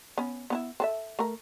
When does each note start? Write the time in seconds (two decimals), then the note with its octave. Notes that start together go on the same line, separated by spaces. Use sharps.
0.18 B3 C#4
0.50 B3 C#4 E4
0.80 C4 A4 E5
1.19 A3 A#4